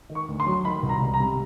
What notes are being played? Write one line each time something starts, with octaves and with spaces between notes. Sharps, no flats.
D#3
C#6
D2
C6
F#3
D#3 B5
C2
A#5
C2
A#5
C3